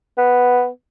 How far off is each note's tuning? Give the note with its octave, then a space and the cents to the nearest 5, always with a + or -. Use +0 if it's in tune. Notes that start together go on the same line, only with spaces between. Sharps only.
B3 +0